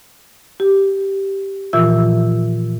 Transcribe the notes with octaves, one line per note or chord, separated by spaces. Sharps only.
G4
A#2 E3 F3 F4 E5 E6